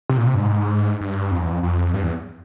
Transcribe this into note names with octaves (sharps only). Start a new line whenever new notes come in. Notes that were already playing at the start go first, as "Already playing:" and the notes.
C3
A#2
C3
G2
G#2
G2
F2
E2
F2
F2
G2
E2